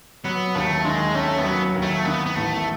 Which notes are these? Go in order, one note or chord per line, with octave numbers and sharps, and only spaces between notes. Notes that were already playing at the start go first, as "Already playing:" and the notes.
F#3 B3
D#2 A3
D#3 G#3
A3 C#4
B3
F#3
D#2
A3
D#3 B3
B3
A1 A3